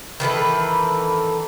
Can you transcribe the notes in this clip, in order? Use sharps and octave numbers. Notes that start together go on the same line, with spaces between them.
D#3 E3 A4 B4